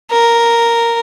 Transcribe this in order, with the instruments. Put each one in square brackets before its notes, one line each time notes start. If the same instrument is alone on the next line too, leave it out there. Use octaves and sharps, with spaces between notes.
[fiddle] A#4